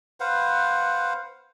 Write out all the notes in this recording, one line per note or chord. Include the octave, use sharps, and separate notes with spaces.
B4 C5 F5 F#5